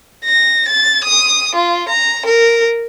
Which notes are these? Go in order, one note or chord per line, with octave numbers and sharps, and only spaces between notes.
A#6
A6
D#6
F4
A#5
A#4